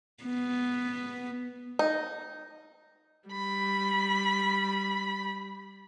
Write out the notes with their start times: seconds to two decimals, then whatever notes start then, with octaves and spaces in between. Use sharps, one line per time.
0.24 B3
1.79 D#4
3.29 G3 B5